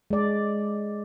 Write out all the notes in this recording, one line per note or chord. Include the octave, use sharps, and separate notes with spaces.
G#3 D5